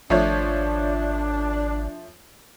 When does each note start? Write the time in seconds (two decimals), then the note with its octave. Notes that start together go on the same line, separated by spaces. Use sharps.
0.10 G#1 F3 A3 D4 C#5